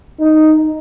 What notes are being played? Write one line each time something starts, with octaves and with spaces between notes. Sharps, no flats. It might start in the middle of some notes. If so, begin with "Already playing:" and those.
D#4